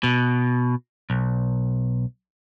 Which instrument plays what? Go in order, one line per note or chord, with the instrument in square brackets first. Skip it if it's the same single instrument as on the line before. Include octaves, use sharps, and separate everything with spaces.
[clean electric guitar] B2
B1